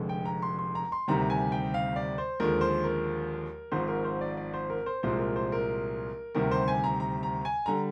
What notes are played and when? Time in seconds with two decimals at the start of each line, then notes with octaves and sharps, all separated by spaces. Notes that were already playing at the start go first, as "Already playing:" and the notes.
Already playing: F1 F2 D3 G#3
0.09 G5
0.25 A#5
0.42 C6
0.59 C6
0.75 A#5
0.92 C6
1.08 D2 C3 D#3 G3 A#5
1.30 G#5
1.52 G5
1.74 F5
1.96 D5
2.18 C5
2.40 D#2 D3 F3 G#3 A#4
2.61 C5
2.84 A#4
3.72 G#1 G#2 F3 C5
3.88 A#4
4.05 C5
4.21 D5
4.37 D5
4.54 C5
4.70 A#4
4.86 C5
5.03 C2 A#2 F3 G#3 C5
5.19 A#4
5.36 C5
5.52 A#4
6.35 D2 C3 D#3 G3 A#4
6.51 C5
6.68 G#5
6.84 A#5
7.00 A#5
7.23 A#5
7.45 G#5
7.66 D3 G3 A#5